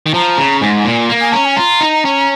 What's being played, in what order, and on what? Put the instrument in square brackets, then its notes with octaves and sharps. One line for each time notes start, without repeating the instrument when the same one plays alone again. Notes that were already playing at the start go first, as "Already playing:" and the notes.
[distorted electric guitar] D#3
[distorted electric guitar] F3 [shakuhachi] A#5
[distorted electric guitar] C#3
[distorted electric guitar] G#2 [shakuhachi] G#5
[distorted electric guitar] A#2
A#3
[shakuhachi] G#5
[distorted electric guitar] C#4 [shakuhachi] A#5
[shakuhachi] G#5
[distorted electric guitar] F4 [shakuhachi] A#5
[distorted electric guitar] D#4
C#4